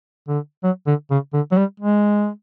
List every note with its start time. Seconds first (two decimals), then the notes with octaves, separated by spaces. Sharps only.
0.28 D3
0.63 F#3
0.87 D3
1.11 C#3
1.33 D3
1.52 F#3
1.57 G3
1.80 G#3